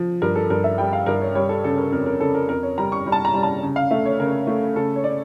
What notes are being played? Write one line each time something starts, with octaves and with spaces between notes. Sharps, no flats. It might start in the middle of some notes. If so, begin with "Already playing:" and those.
Already playing: F3
G2 A#4
A4
G2 A#4
E5
G3 G5
F5
G2 A#4
C#5
G3 C#5
A4
C#3 A4
A#4
F2 A#4
A#4
C#3 A4
A#4
F2 A#4
C#5
G3 A#5
C#6
G3
A5
A#5
G3
A5
C#3
F5
A3 E5
C#5
C#3 A#4
A3
C#3 A4
C#5
C#3 D5